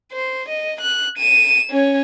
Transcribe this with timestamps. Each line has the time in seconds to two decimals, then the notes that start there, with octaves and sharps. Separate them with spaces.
0.12 C5
0.49 D#5
0.81 F#6
1.18 D#7 E7
1.70 C#4 C#5